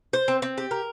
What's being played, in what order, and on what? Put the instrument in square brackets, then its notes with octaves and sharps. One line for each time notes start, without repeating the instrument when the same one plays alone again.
[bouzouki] C5
C4
C4
G4
A#4